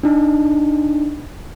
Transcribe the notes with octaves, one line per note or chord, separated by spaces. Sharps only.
D4 D#4